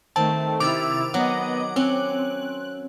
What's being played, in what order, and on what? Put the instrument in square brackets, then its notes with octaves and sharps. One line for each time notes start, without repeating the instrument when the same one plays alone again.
[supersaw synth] D#3 A3 [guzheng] C4 [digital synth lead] A5
[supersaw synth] C3 E4 [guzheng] D#3 [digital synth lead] D6 [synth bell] E6 A6 F7
[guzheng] F#3 [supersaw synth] B3 D#5 [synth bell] F#5
[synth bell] C4 F#7 [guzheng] C#4 [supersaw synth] F#6